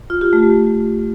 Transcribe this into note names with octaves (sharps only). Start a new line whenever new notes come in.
F4
G4
A3